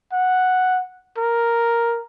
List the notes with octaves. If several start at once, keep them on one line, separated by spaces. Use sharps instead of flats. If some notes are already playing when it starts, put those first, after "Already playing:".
F#5
A#4